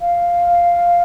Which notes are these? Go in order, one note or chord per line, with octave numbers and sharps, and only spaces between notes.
F5